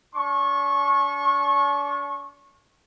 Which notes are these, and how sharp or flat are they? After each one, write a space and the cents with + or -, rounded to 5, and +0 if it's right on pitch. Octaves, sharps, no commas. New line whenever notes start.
D4 -45 C#6 -20